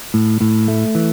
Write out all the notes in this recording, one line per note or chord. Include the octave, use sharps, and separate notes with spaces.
A2
A2
A3
E3